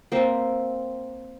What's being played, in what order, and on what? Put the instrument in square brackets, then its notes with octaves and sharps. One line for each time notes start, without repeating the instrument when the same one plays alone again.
[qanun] A#3 C4 E5